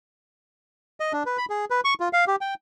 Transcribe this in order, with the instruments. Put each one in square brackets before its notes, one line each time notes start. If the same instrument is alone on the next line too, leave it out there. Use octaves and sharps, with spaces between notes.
[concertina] D#5
D4
B4
B5
G#4
B4
C#6
F4
F5
G4
G5